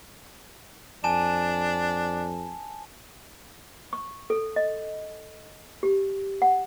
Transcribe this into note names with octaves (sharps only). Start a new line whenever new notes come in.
F2 D4 G#5 A5 E7
C#6
A4
D#5
G4
F#5